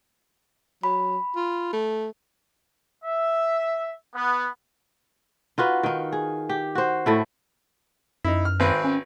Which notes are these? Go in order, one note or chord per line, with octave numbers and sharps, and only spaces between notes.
F#3 B5
F4
A3
E5
B3
D#4 F4 F#4 B4
D#3 D#4
G#4
G4
F#4 C5
A2 A3 E4
F#2 D#4 E4
F6
G#1 C4 B4
C#4